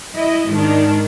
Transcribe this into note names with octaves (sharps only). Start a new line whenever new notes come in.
E4 D#5
G#2 D#3 D4